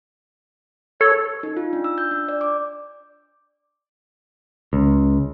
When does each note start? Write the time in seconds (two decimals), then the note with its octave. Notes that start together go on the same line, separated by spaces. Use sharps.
1.01 A4 C#5
1.43 D#4
1.57 F4
1.73 D4
1.84 E6
1.98 G6
2.11 D4
2.29 D5
2.41 D6
4.73 C#2